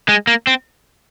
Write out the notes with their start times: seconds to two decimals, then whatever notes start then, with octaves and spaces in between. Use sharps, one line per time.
0.09 G#3
0.27 A#3
0.47 C4